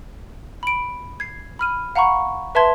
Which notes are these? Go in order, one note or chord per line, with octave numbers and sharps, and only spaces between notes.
B5 D7
G#6 C7
B5 F6 D#7
F5 F#5 A#5 B5 C#6
B4 E5 A5 C6 G#6